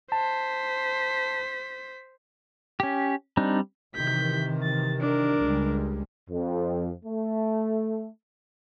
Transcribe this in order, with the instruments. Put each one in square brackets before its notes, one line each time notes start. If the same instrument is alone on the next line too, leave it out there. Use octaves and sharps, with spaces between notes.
[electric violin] C5 B6 [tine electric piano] A5
[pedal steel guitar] C#4 G4
G3 C4 D4 D#4
[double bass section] C3 D#3 E3 [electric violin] G6 B6
[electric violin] A6
D4 A#4
[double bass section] C#2 G3 G#3
[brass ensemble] F2
A3